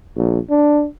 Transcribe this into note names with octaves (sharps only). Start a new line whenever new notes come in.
A#1
D4